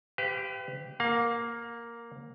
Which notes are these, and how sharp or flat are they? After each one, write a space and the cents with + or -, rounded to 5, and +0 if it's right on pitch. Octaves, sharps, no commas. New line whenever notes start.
G4 +0 B4 +40 F5 -25
A#3 +0 F5 +30